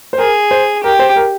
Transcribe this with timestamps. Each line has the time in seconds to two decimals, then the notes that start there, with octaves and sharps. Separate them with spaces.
0.13 C5
0.18 G#4 A#4
0.51 C5
0.83 G4 A#4
0.99 C5
1.16 A#4